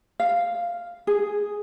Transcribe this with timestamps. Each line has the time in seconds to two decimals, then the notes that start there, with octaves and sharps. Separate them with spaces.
0.20 F5
1.07 G#4